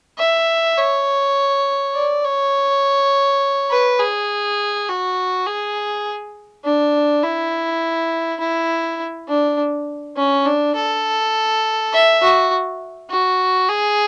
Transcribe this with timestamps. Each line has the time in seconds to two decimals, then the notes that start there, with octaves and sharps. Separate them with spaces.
0.19 E5
0.77 C#5
1.94 D5
2.25 C#5
3.71 B4
4.00 G#4
4.89 F#4
5.47 G#4
6.65 D4
7.23 E4
8.40 E4
9.28 D4
10.17 C#4
10.46 D4
10.75 A4
11.93 E5
12.22 F#4
13.10 F#4
13.69 G#4